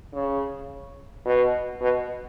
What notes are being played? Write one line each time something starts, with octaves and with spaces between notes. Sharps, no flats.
C#3
B2
B2